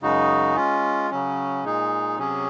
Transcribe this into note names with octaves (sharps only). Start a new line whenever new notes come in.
F#2 C#3 G#3 D#4 F#4
G#3 C#4 F4
C#3 F#3 C#4
A#2 G#3 D#4 G#4
C3 F#3 C#4 G#4